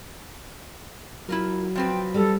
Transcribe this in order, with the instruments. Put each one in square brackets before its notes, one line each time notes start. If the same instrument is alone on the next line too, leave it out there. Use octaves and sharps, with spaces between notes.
[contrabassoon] F#3 [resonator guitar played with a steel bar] E4 F4 A#4
[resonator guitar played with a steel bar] F3 C4 B4 [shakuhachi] G5
[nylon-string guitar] G3 [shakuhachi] A4